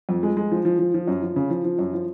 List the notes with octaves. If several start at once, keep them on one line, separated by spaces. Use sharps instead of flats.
F2
G#3
G#3
F3
F3
F3
F3
F#2
F3
C#3
F3
F3
F#2
F3